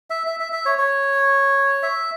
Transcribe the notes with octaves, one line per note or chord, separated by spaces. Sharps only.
E5
E5
E5
E5
C#5
C#5
E5